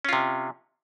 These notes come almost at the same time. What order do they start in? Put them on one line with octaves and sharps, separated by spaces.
C#4 F4 C3